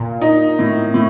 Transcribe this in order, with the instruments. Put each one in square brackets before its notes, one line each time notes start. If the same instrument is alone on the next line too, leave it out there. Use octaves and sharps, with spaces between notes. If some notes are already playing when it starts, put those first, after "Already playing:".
Already playing: [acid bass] A#2
[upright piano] D#4
A2
A2